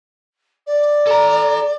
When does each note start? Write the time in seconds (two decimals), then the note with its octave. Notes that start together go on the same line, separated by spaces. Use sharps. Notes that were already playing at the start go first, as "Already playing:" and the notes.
0.67 D5
1.07 A4 A#5